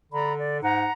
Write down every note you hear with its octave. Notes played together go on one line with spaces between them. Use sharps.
D3 D5 A#5 B5
D5
G#2 F#5 A#5